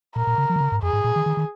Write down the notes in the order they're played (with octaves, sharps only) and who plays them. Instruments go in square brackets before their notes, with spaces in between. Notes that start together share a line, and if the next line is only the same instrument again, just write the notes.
[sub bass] A#2 [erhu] A#4
[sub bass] A#2
C#3
F3
D#3
C#3
G#2
[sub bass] F2 [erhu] G#4
[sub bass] G#2
A#2
D#3
D#3
D#3